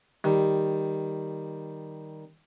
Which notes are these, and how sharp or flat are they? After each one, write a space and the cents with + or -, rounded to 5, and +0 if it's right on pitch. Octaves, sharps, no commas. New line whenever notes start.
D#3 +0 G3 +0